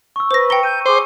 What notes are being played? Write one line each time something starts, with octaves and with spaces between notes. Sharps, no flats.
C#6 E6
B4 C5 A#6
G5 A#5 A#6 C#7 G7
C#6 G6 D#7
G#4 C5 D6